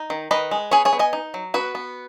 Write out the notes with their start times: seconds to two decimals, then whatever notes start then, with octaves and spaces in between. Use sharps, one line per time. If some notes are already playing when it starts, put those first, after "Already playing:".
Already playing: D#4
0.10 D#3
0.31 D#3 B4 D#5
0.51 G#3
0.71 B3 G#4 C#5
0.85 G#4 C#5
0.93 B3
0.99 D#5 G#5
1.13 D#4
1.34 F#3
1.54 B3 F#4 B4
1.75 B3